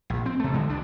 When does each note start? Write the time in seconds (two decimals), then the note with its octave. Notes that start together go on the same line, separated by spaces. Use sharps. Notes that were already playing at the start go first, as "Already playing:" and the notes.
0.10 A#1
0.26 C4
0.40 C3 A3
0.54 D3 G#3
0.69 C#2 G3 D4